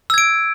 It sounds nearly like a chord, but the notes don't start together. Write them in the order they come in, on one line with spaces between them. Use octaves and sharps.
E6 G#6 D7